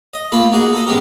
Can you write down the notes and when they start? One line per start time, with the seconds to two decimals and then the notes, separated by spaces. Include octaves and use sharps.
0.14 D#5
0.32 A3 A#3 F4 B5
0.52 A#3 D#4 F#4 G#4
0.73 A4 D#5
0.87 A1 G#3 B3 G4 A#4